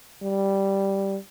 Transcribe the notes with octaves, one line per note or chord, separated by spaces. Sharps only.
G3